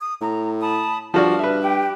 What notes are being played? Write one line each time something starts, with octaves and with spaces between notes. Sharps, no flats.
D#6
A2 A#5
A5 B5 D#6
G2 F3 F#4 D5 F6
B4 E5
G4 G5